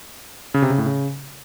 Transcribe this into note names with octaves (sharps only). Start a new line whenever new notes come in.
C#3
C3
C#3
A2
C#3